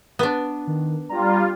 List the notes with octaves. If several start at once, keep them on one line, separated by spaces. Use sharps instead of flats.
B3 D4
D#3
G3 F4 A#5